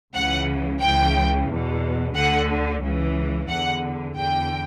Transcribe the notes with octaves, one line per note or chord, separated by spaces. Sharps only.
C#2 C#3 E3 F#5
C#2 C#3 E3 G5
E2 B2
D2 D3 F#5
C#2 C#3 E3
E2 D3 F#5
E2 D3 G5